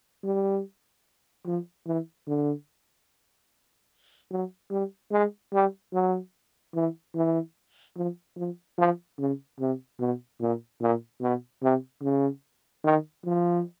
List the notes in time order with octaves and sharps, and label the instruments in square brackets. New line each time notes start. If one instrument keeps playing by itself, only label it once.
[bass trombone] G3
F3
E3
D3
F#3
G3
G#3
G3
F#3
E3
E3
F3
F3
F3
C#3
C3
B2
A#2
A#2
B2
C3
C#3
D#3
F3